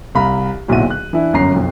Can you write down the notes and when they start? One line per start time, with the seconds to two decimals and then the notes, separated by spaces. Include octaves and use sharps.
0.15 C2 F5 A#5 B5
0.68 D1 B1 A#2 E4 F#4 D#7
0.90 F#6
1.13 E3 D4 E4
1.33 G1 F#2 C#4 A#5 C7
1.55 B1 F2